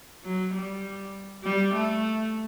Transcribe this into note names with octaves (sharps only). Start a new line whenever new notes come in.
F#3
G3
G3
A3